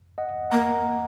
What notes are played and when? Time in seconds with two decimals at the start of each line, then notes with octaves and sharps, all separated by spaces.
0.18 D#5 F#5
0.50 A#3 F#5 A#5